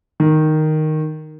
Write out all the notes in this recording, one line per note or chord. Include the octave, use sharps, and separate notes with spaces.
D#3